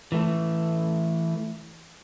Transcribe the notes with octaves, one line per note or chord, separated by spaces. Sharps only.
E3 A3